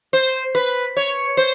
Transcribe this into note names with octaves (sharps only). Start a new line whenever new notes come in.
C5
B4
C#5
C5